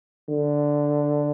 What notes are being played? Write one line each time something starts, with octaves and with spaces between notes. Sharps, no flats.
D3